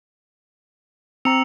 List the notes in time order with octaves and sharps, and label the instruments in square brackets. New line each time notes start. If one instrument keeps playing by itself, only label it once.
[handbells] C4 A#5 [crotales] E6 C#7 F7